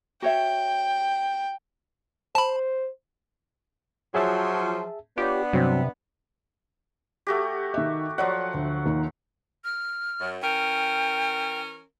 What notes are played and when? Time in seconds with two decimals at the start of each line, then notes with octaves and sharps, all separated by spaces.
0.22 F#4 C#5 E5 G5
2.35 C5 A5 B5
4.15 F3 F#3 G#4 E5 A5
5.18 B3 D4 F4 G4 C#5
5.53 G2 C3 F#3 C4
7.27 A3 F#4 G4
7.74 D#3 E5
8.18 F3 F#3 C#5 D5 F#5
8.54 D2
8.86 D#2 D#3
9.64 F6
10.21 F#2
10.42 E3 C#4 A#4 G5